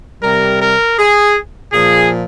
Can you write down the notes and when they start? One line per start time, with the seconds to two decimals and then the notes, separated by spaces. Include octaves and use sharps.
0.23 C3 G3 A#4
0.61 A#4
0.98 G#4
1.73 A#2 F3 G#4